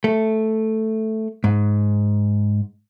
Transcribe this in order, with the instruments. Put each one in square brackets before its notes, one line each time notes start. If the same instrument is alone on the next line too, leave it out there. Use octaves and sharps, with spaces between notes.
[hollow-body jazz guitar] A3
G#2